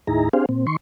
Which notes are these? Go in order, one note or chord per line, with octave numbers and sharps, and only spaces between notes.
D#2 A2 D#4 E4 G#4 A#5
C4 D4 G4 G#4 C5 F5
A#2 C4
D#3 C6 C#6